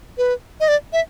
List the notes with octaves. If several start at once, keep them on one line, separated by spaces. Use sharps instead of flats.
B4
D#5
D5
E5